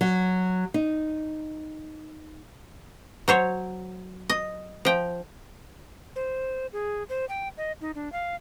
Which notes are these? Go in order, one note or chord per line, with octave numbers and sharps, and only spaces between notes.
F#3
D#4
F#3 C5 C#5
D#5
F3 G5
C5
G#4
C5
G5
D#5
D#4
D4
F5